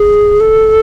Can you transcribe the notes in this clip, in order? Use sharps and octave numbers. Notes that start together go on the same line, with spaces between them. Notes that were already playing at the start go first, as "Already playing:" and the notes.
Already playing: G#4
A4